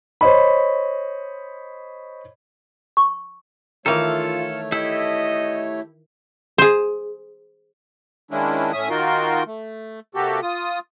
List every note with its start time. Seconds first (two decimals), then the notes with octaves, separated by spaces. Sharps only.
0.21 C5 C#5 D#5 B5
2.97 C#6
3.86 D#3 E3 A3 F4 A4 C#5 F5
4.72 E4 G4 A4 D#5
6.58 G#4 C5
8.31 D#3 G#3 A#3 C#4 D4 E4
8.73 A2 C#4 E5 D#6
8.89 D#3 D#4 F4 F#4 A#4 C6
9.46 A3
10.15 C3 A#3 F#4 G4 A4
10.43 F4 D#6